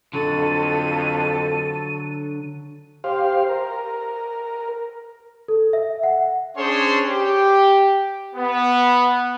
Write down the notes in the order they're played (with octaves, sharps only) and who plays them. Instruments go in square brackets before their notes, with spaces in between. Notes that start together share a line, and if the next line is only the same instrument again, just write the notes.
[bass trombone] F2 [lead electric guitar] D3 F#3 [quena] A4 [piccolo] D#7
[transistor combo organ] G4 C5 F5
A#4
[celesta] A4
E5
F#5
[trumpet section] C#4 D4 G#4 C5 C#5 C6
G4
B3